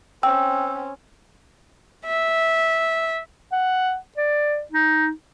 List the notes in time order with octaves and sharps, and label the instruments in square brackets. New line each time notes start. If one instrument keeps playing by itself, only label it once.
[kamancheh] C4 C#4 [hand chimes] G5 E6
[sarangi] E5
[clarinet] F#5
D5
D#4